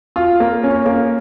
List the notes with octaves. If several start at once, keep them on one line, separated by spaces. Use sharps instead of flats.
F4
A#3
C#4
A#3